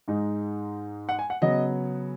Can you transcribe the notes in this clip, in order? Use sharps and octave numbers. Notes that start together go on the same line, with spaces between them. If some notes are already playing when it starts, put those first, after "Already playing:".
G#2 G#3 D#4
F#5
G#5
F#5
C#3 F#3 B3 D#5